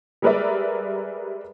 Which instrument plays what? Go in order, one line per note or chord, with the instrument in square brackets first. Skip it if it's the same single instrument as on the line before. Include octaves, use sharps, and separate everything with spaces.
[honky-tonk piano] G3 G#3 A#4 B4 D5 E5